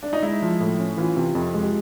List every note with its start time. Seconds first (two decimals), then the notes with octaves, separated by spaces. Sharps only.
0.03 D4
0.13 D#4
0.22 G#3 E4
0.42 F3
0.60 A2
0.80 C#4
0.98 E3 F4
1.16 C3
1.35 F2
1.54 G#3
1.63 G4